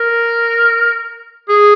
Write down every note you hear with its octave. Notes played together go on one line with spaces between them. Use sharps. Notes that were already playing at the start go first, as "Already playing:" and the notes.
Already playing: A#4
G#4